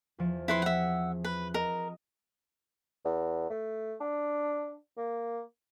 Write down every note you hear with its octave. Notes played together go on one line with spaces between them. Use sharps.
E2 F3 D7
C4 E4 G#4 B4 C6
E5 F#5
B4
A#4 D#5
E2
A3
D4
A#3